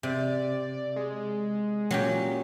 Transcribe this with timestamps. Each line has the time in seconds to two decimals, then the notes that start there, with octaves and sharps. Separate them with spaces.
0.03 C3 D5
0.96 G#3
1.91 A#2 F#3 C#4 G4